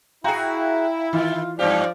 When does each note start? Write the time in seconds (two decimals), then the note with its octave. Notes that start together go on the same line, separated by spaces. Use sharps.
0.24 E4 F#4 G#4 F5 G5 A#5
1.13 D#3 E3 F4
1.59 G2 F3 C4 G4 D5